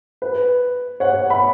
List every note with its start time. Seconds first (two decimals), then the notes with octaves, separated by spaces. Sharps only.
0.22 B4
1.00 C#5 F#5
1.30 B5